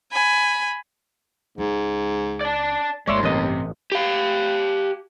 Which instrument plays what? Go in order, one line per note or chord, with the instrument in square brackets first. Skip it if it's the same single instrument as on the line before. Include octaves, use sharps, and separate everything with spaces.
[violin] G#5 B5
[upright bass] C#2 C#3 [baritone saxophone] G#2
[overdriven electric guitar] D5 A5
[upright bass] G#1 [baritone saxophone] D#2 [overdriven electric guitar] G#3 C6 [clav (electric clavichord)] C#5 D5 E5
[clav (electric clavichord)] A1 D#5 [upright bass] G2 [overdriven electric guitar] C3
[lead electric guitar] G4 F5